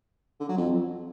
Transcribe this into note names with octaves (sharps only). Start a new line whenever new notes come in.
D3
F#3
F2